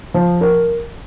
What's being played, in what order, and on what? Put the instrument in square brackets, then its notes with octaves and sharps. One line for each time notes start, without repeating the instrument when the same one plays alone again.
[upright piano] F3
A#4